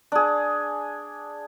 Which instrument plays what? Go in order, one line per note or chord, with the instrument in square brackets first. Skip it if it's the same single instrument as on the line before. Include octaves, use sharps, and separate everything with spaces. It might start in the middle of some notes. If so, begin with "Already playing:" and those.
[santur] D4 G#4